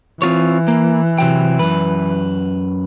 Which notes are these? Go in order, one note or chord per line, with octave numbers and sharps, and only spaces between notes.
E3 C4 F4 C#5
A#3
C3 F#3 G5
F#2 B4